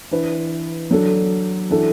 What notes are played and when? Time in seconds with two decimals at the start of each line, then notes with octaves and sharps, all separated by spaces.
0.11 E3 D4 B4
0.91 F#3 D4 A4
1.70 E3 D4 F#4 A4